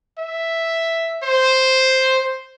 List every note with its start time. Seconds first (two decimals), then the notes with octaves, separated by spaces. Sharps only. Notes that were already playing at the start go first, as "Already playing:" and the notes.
0.18 E5
1.24 C5